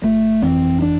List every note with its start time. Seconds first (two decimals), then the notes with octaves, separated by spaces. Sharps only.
0.03 G1 A3
0.42 F2 E3 C4
0.82 D4